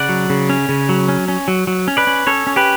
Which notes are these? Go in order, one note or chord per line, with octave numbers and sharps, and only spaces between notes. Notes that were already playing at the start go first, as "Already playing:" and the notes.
Already playing: C#3 D5 F#5
F#3
C#3
C#4
C#3
F#3
C#4
C#4
F#3
F#3
C#4
B4 D5
C#4
C#4 A4 C#5
C#4
G4 B4